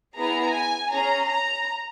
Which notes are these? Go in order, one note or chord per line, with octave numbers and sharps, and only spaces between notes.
B3 E4 G#4 A#5
G#5
C#4 G#4 A#5
A#5